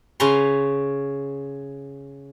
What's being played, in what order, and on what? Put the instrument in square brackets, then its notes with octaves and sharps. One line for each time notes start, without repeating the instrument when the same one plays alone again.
[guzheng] C#3 C#4 B4 A#5 C6